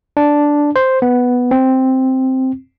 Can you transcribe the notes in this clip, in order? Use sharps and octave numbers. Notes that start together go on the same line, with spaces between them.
D4
C5
B3
C4